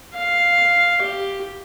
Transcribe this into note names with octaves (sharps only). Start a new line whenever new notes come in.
F5
G4